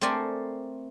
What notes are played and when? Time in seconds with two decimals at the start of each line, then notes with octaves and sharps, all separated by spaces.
0.01 A3 C4 A#4 C5 D5 G#5